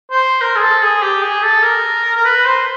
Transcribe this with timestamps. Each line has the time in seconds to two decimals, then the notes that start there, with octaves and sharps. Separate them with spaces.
0.10 C5
0.41 A#4
0.56 G#4
0.61 A4
0.82 G#4
1.02 G4
1.23 G#4
1.43 A4
1.63 A#4
2.17 A#4
2.25 B4
2.45 C5